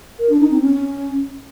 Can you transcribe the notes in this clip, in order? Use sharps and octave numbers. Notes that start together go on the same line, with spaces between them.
A#4
D4
D#4
C4
C#4